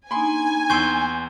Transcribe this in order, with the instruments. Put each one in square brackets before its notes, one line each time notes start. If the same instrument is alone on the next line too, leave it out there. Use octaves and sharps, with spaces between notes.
[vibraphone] A#3 D4 D#4 [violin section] G#5 [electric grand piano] B5 C6
[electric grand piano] E2 G5 E6 [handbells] C6 C#6 G6